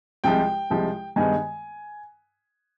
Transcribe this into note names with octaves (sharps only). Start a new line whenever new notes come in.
C2 C3 F3 G#3 G5
C2 C3 F3 G#3
G2 D#3 G#3 B3 G#5